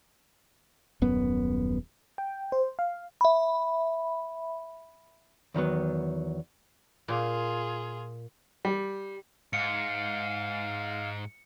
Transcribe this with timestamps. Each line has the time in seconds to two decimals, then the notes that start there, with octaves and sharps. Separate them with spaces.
1.02 D#1 F#2 B3
2.18 G5
2.52 C5
2.79 F5
3.21 E5 B5
5.54 E2 D#3 F#3 B3
7.08 A#2 F4 G#4
8.65 G3
9.53 G#2 F5 C#7